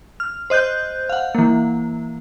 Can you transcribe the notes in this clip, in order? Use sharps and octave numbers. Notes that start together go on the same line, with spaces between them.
F6
C5 D#5 F#6 G6
F5 F#5
E3 A#3